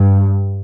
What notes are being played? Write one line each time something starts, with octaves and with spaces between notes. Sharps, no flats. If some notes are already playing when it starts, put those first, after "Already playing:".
Already playing: G2